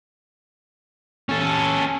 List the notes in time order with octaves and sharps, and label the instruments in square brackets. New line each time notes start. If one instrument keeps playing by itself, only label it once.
[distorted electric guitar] C#4 A4